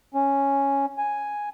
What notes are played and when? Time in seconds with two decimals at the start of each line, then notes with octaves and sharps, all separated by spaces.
0.14 C#4
0.98 G#5